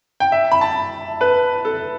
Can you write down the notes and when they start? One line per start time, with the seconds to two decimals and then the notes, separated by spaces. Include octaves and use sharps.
0.20 G5
0.32 E5
0.52 B5
0.61 A5
1.21 B4
1.65 A4